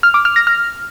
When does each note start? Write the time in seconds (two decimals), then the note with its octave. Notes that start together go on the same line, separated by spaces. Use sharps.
0.03 F6
0.14 D6
0.25 F6
0.36 A#6
0.47 F6